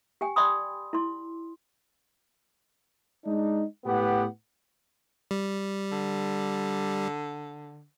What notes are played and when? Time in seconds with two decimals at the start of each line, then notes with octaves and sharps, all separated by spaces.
0.21 G4 G5 G#5
0.36 D5 G5 B5 C6 D#6
0.93 E4 C6
3.25 G#3 D4 D#4
3.85 A2 B3 G4 B4 F#5
5.31 G3
5.92 D3